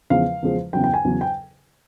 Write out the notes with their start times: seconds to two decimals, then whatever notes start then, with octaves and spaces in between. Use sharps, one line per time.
0.10 E2 C#3 F3 G#3 F5
0.42 E2 C#3 F3 G#3
0.73 E2 C#3 F#3 G5
0.84 G5
0.94 G#5
1.04 E2 C#3 F#3
1.21 G5